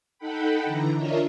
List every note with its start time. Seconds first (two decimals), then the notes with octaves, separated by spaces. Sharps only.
0.18 D#4 A4 F#5 G5 B5
0.64 D3 E3 A#5
0.95 D4 F4 A#4 C#5 D#5 E5